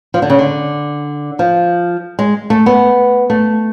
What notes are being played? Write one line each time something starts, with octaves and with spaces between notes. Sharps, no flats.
F3
D3
C#3
D3
F3
G#3
A3
B3
A3